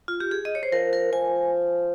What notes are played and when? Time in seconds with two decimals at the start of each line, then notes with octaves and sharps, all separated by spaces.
0.08 F4
0.20 G4
0.31 G#4
0.45 D#5
0.55 C#5
0.63 C5
0.72 F3 A#4
0.93 A#4
1.12 F3 G#5